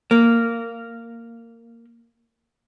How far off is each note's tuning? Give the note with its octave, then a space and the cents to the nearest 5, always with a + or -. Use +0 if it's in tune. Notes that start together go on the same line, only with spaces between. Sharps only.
A#3 -15